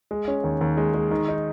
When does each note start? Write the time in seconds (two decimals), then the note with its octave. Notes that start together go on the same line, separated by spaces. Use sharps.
0.11 G#3
0.28 C#4
0.44 D#2
0.61 D#2
0.77 G#3
0.94 G#3
1.11 D#3
1.28 D#4